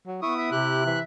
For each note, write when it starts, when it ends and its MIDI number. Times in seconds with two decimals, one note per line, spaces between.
0.07 0.19 54
0.22 0.47 59
0.22 0.84 64
0.22 0.37 85
0.22 0.50 87
0.37 0.50 76
0.52 0.99 48
0.52 0.83 67
0.52 0.99 90
0.86 1.01 52
0.86 1.03 76